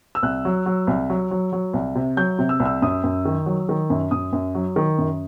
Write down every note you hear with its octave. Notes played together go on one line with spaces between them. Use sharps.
E6
C2 F#6
F#3
F#3
C2
F#3
F#3
F#3
C2
C3
F#3 G6
C3
E6
C2
E6
F#2 D#6
F#2
D#3
F#3
D#3
F#2
F#2 D#6
F#2
F#3
D#3
F#2